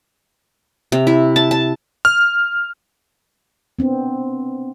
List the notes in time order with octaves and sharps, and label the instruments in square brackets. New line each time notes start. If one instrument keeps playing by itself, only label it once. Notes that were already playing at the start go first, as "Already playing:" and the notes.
[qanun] C3
E4
A5
A5
[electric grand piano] F6
[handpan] B3 C4 D4